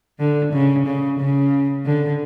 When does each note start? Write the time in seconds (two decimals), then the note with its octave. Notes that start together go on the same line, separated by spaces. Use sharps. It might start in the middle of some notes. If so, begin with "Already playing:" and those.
0.19 D3
0.53 C#3
0.87 C#3
1.20 C#3
1.86 D3